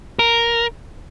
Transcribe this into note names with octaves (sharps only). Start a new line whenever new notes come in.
A#4